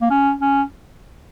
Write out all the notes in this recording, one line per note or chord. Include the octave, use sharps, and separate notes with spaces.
A#3
C#4
C#4